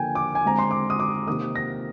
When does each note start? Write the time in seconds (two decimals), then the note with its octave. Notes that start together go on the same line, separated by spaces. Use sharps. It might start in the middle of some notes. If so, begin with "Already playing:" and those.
Already playing: D3 F3 A#3 G5 G#5
0.15 D6
0.35 G#5
0.44 D3 G#3 C4 A#5
0.59 C6
0.71 D6
0.90 D#6
1.00 D6
1.27 C3 D#3 A#3 D#6
1.55 A#6